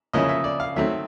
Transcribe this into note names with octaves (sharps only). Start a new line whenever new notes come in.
C#3 F3 A#3 C#4 E4 D#5
E5
D5
F5
D#3 F#3 A3 C4 E5